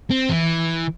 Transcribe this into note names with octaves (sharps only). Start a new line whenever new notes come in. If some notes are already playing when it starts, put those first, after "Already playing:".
C4
E3